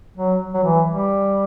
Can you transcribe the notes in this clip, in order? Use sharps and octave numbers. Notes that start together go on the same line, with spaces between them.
F#3
F#3
E3
G3